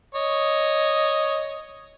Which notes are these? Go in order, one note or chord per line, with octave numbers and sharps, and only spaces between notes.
C#5 D#5